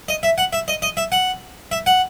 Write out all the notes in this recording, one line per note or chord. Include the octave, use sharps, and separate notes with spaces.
D#5
E5
F#5
E5
D#5
D#5
E5
F#5
E5
F#5